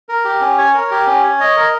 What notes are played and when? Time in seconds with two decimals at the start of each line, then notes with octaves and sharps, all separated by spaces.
0.09 A#4
0.25 G4
0.41 C#4
0.58 C#5
0.75 A#4
0.91 G4
1.07 C#4
1.24 C#5
1.40 D#5
1.57 A#4